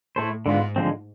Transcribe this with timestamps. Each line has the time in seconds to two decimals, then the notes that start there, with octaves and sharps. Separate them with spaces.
0.16 A2 A3 E4 A4 C5
0.46 G#2 D3 G#3 B3 F4
0.76 D3 F3 G#3 C4